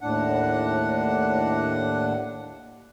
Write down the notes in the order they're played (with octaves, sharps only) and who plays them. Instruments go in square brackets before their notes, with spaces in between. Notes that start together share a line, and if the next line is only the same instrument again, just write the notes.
[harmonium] D#2 A2 D4 F#5